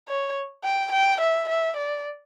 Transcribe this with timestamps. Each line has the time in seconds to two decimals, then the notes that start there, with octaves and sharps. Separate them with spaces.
0.08 C#5
0.64 G5
0.92 G5
1.21 E5
1.49 E5
1.77 D5